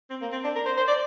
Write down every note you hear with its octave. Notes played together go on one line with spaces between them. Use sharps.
C4
A#3
C4
D4
A#4
C5
C5
D5